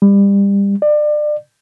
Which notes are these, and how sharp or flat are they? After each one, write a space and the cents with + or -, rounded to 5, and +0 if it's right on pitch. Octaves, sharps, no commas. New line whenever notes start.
G3 +25
D5 +30